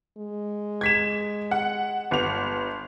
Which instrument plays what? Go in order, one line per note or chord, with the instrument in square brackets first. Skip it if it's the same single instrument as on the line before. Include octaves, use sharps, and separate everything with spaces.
[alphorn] G#3
[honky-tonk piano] G#6 B6 E7
F#5
G1 F7